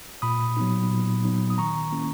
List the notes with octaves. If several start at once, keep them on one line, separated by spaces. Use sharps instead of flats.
A#2 B5 D#6
F#3 B3 D#4
A#2
F#3 B3 D#4
D#6
D#3 A#5 C#6
A#3 C#4 E4